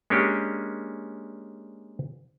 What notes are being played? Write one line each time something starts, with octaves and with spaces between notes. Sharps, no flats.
G#3 A#3 C#4 D4 G4